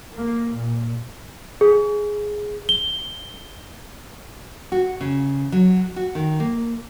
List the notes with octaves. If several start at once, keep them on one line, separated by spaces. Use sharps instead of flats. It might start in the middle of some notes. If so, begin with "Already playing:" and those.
A#3
A#2
G#4
G7
F#4
C#3
F#3
F#4
D#3
A#3